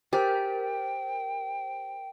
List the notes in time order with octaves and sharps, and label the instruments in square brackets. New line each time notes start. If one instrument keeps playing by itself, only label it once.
[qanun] G4 [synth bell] A#4 C5 [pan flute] G5